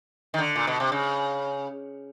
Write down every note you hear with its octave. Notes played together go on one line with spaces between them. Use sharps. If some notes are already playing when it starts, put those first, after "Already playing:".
D#3
D3
A#2
B2
C3
C#3